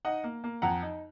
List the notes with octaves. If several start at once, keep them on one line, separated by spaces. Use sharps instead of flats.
D#4 D#5 F#5
A#3
A#3
F2 F#5 A#5
D#4